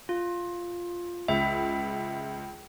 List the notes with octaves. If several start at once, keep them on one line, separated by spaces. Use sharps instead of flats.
F4
C#2 E5